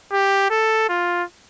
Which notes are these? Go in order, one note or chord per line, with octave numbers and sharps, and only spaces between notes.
G4
A4
F4